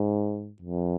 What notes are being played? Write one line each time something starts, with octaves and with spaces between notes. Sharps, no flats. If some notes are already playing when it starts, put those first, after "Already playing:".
Already playing: G#2
F2